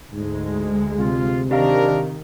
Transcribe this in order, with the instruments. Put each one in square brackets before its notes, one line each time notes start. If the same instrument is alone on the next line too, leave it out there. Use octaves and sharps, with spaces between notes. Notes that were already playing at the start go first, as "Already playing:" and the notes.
[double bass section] D2 G#3 [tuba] G#2
[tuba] C3 [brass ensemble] F4
[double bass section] D#3 [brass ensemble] C4 D4 A#4 [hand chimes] G4 D#5 F5